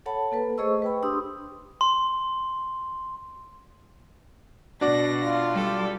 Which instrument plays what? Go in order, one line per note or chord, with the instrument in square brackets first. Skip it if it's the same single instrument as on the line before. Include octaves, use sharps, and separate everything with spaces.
[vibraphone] A4 C#5 F#5 A5 B5
A#3 A4 B4
A3 G#4 C5 D#5 C#6 E6
B4 G5 B5
D4 G4 C6 D#6 E6
[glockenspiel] C6
[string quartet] B2 A#6 [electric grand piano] D4 F#4 D5
[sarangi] F4
[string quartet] G3 A4